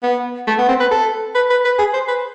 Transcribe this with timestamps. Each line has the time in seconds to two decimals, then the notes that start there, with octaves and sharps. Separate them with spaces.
0.03 B3
0.47 A3
0.58 B3
0.69 C4
0.80 B4
0.91 A4
1.35 B4
1.50 B4
1.65 B4
1.79 G#4
1.94 C5
2.08 B4